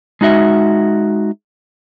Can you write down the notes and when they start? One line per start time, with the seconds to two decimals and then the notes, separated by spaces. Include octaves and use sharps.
0.21 G#3 D#4 F#4 E5